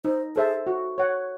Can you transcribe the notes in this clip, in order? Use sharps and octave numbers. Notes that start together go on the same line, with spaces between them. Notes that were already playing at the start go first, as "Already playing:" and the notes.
D#4 C5
G#4 A4 C5 E5 A5
F#4
C#5 F#5